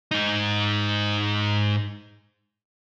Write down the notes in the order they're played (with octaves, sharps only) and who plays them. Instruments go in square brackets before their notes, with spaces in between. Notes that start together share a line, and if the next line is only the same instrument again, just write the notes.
[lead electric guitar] G#2 D#4